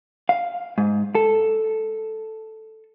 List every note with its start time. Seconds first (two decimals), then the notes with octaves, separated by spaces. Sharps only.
0.29 F5
0.78 G#2
1.15 A4